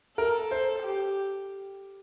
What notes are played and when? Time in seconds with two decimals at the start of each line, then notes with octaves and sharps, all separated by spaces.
0.18 A4 A#4
0.51 C5
0.83 G4